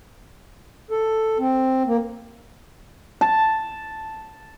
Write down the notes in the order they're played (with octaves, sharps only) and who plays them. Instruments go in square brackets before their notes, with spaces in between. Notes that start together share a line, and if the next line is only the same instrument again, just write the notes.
[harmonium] A4
C4
A#3
[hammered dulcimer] A5